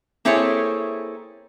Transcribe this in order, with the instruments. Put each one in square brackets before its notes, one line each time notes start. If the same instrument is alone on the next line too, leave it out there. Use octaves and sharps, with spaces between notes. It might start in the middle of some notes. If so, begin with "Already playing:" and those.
[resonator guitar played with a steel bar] A#3 C4 E4 G#4 A4 C#5